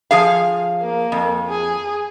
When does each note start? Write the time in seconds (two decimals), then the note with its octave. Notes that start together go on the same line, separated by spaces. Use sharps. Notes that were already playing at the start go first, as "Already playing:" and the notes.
0.11 F3 G#4 F5
0.82 A#3
1.12 F2
1.49 G#4